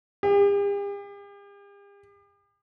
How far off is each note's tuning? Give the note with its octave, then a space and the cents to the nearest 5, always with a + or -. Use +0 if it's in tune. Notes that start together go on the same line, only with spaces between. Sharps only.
G4 +45